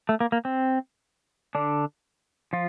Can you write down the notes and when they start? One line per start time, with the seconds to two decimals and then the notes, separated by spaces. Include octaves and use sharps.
0.09 A3
0.20 A#3
0.32 A#3
0.45 C4
1.55 D3 D4
2.53 F3 F4